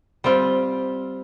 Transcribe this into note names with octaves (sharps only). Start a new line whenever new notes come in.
G3 C4 F4